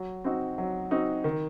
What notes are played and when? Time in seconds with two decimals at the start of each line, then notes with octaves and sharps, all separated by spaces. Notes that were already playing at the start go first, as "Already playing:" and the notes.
Already playing: F#3
0.24 C4 D#4 F#4
0.58 F#3
0.91 C4 D#4 F#4
1.24 D#3